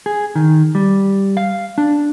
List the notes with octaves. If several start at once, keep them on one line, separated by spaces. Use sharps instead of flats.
G#4
D#3
G3
F5
D4